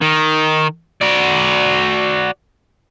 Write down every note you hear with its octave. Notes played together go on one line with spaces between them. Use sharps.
D#3
F#4 D5